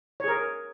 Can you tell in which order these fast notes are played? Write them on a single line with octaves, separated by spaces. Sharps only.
C#5 G#4 A#4